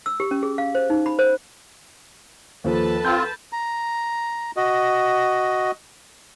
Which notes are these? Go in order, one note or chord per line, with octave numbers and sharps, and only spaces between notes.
E6
G4
C#4
G#4
F5
C5
D#4
B5
C5
D#2 F3 A4 B4 A5
C4 F4 G6
A#5
F#4 D#5